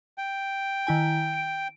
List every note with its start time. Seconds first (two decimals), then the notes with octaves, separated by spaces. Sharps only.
0.18 G5
0.87 D#3 E4 G#5
1.34 D7